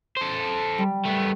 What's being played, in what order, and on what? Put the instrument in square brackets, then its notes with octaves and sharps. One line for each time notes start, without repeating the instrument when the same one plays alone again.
[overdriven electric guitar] A4 C5
[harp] G3
[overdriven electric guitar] A3 B3